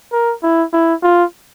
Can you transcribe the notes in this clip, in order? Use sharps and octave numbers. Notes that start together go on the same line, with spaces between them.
A#4
E4
E4
F4